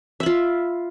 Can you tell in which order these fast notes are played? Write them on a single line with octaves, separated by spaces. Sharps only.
E5 B5 F4